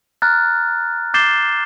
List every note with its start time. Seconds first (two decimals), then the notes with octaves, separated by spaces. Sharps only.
0.22 A#5 F6 F#6 A6
1.14 D6 G6 A6 C7 E7 G7